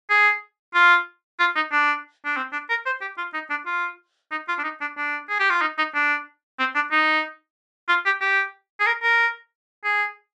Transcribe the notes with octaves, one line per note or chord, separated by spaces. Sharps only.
G#4
F4
F4
D#4
D4
D4
C4
D4
A#4
C5
G4
F4
D#4
D4
F4
D#4
F4
D4
D#4
D4
D4
G#4
G4
F4
D#4
D#4
D4
C4
D4
D#4
F4
G4
G4
G#4
A#4
A#4
G#4